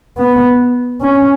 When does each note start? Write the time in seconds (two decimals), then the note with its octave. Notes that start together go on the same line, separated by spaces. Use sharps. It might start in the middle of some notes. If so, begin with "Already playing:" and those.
0.17 B3
1.02 C#4